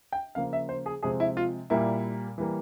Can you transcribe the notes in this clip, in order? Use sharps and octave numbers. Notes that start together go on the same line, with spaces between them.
G5
C#3 F3 A#3 F5
E5
C5
G#4
C3 F3 G#3 C4 G#4
E4
F4
A#2 G3 A#3 E4
E3 G3 A#3